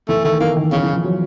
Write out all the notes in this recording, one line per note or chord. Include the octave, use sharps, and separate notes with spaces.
E3 A3
D#3 A3
E3 A#3
D#3
C#3 E3
E3
F3
F#3